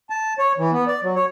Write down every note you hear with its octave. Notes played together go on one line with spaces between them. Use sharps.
A5
C#5
E3
B3
D5
F#3
C#5